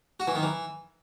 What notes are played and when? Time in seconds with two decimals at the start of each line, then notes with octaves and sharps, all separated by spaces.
0.20 F#4
0.27 E3
0.35 D#3
0.43 E3